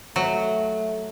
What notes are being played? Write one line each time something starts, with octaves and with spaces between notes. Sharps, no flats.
F#3 A3